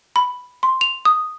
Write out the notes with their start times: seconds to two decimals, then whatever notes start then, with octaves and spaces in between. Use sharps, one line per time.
0.16 B5
0.63 C6
0.81 F7
1.05 D#6